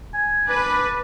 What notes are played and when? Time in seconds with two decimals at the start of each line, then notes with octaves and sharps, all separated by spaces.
0.14 G#5
0.48 D4 B4